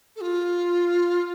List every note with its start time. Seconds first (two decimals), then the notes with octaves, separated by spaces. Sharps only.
0.16 A4
0.21 F4